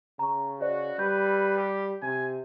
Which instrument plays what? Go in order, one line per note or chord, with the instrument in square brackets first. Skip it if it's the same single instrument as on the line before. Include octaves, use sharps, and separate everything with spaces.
[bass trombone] C#3 [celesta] A#5 C#6
[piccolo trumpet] F#4 [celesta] C5 D5 D#5
[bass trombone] G3 [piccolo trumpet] B4 [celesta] G6
[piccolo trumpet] G4
[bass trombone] C3 [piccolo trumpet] G#5